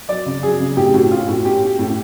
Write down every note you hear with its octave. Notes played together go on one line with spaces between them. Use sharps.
F#3 D5
C#3
F#3 G#4
C#3
A2 G4
A2 F#4
C#4 F4
A2 F#4
C#4 G4
C#4
A2